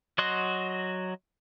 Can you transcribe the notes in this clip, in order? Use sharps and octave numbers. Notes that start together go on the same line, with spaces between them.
F#3 F#4 D#5 C6 F#6